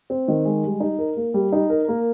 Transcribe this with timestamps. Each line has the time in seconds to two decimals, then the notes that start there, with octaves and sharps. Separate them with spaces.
0.10 C4
0.28 D#3
0.45 G#3
0.64 G3
0.80 D#4
0.99 A#4
1.16 A#3
1.34 G3
1.53 D#4
1.70 A#4
1.88 A#3